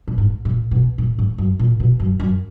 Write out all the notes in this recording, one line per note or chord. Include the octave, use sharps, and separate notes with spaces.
A#2
G#2
A#2
B2
A#2
G#2
F#2
A#2
B2
F#2
F#2